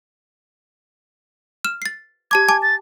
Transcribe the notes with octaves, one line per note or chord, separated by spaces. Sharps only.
F6 E7
A6 C7
G4 A5 D6 G#6
G#5 A5 D6
A6